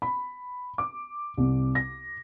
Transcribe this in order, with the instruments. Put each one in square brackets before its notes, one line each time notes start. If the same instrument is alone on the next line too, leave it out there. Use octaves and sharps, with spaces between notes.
[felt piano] B5
D6
C2
A#6